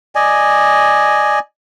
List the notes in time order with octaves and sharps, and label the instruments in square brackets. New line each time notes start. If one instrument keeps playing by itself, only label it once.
[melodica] D5 D#5 G#5